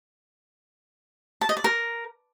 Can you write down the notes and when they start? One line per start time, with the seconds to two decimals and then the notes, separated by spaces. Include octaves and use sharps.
1.41 A5
1.49 D#5
1.57 D5
1.64 A#4